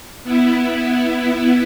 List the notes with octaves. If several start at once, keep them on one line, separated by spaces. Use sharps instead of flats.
B3 E4